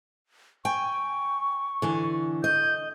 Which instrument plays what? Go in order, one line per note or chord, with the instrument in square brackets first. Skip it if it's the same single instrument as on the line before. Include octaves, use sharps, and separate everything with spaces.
[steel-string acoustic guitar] G5 G#5 [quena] C#6
[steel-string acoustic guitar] D3 E3 G#5
[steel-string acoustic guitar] D#5 [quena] G6